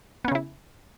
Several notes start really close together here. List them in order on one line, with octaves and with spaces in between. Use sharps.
B3 C#4 C#3 E4